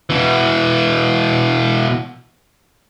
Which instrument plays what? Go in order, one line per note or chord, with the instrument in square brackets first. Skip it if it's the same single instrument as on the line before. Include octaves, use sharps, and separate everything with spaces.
[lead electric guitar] B2 E3